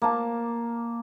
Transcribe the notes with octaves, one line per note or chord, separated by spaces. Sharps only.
A#3 A5